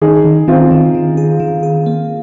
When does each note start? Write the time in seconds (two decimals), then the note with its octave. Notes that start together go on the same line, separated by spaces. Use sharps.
0.02 D#3 D#4 G#4
0.24 D#3
0.48 D#3 C4 F4
0.71 D#3
0.95 D#3
1.17 G#4
1.40 D#3
1.63 G#4
1.86 A#3